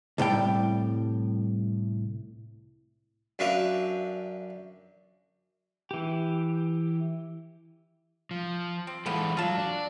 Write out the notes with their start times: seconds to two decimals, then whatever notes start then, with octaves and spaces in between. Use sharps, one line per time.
0.18 C2 A2 G3 G5
3.39 F#2 D4 B4 E5 F5
5.91 E3 G4
8.31 F3
8.87 C4
9.06 E3 F3 G#3 B3 A4
9.37 F#3 F4 A5
9.57 D4